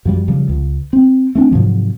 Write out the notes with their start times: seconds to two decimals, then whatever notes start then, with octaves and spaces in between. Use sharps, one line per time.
0.05 F#2 F3 G3
0.28 C#3 F3 G3
0.49 C#2
0.93 C4
1.35 A3 C4 D4
1.51 G#2 C3 F3 F#3